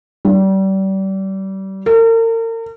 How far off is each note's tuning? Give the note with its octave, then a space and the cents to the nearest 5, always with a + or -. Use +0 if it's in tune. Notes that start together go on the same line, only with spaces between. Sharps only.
G3 -30
A#4 -40